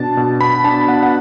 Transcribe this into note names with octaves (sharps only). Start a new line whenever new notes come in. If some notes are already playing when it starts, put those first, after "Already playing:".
Already playing: B2 D4 A5
B2
B3 B5
D4 A5
B3 F#5
F#5